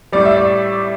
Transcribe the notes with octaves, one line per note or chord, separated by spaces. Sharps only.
A2 G3 D5
E5
D5